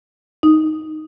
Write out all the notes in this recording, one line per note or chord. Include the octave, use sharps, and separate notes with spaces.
D#4